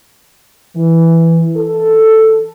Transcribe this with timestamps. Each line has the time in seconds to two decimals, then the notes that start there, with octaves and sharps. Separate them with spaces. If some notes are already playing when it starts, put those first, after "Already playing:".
0.76 E3
1.55 A4